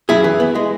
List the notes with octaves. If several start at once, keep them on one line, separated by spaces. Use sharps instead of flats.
F#2 E4 G#4
E3
B3
G#3